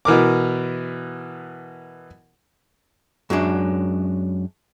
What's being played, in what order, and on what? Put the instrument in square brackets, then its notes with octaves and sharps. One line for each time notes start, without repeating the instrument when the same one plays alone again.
[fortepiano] B2 E3 A#4 D6
[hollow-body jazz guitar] F#2 F#3 G#3 D4